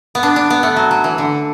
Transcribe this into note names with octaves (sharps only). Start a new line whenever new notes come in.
B3
D4
D4
B3
A3
F#3
F#3
E3
D3